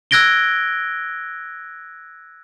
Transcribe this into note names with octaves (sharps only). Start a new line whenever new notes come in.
E6 F#6 G#6 A#6 D7 G7